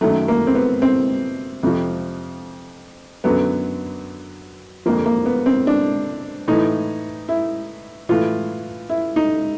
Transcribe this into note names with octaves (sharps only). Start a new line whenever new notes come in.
F#2 D#3 F#3 A3
A#3
C4
B3
C4
F2 C3 F3
F#2 D3 F#3 B3
F2 D3 F3 A#3
A#3
B3
C4
D4
A2 E3 D#4
E4
A2 E3 F4
E4
D#4